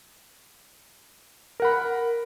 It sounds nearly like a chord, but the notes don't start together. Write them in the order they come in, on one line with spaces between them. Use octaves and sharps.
A#4 F#5 B5